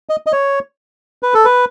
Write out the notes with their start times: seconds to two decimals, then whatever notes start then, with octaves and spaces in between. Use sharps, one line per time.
0.09 D#5
0.26 D#5
0.32 C#5
1.23 B4
1.34 A4
1.45 B4